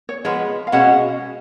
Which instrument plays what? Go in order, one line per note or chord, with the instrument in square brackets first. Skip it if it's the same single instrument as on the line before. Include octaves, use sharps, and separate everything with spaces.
[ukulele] C#5
[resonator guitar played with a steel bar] F3 G#3 B3 [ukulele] C#5
[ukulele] F5
[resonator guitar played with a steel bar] B2 G#3 C#4 F#4 [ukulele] F#5